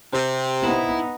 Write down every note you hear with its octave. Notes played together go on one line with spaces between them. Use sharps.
C3 C5
B3 D#4 E4